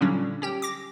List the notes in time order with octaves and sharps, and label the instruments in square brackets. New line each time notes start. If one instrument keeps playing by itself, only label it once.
[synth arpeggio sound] A#2 D3 F#3 G3 C#4 D4
C#4 G4 G5
D6 A#6